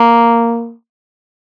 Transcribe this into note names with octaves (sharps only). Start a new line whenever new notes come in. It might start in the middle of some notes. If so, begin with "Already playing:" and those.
Already playing: A#3